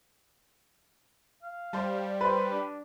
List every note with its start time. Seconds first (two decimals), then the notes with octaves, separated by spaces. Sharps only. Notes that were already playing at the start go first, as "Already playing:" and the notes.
1.43 F5
1.73 G3 C5 A5
2.21 B4 C5
2.51 D4